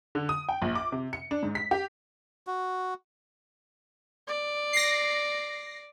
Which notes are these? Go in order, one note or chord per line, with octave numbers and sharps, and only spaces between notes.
D3
D#6
G5
A#1
D6
C3
C#7
D4
G#2
B6
G4
F#4
D5
A#6 C7